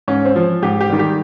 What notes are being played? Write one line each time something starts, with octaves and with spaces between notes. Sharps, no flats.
G#2 C#4
C4
F3
G#2 G4
G4
D#3 G3
G4